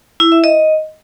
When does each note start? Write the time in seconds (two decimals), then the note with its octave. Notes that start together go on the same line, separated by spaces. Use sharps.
0.20 E4
0.32 E5
0.44 D#5